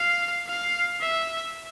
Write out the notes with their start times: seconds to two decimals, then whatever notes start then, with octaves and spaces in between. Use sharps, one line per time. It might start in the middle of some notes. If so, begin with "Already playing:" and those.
Already playing: F5
0.47 F5
1.01 E5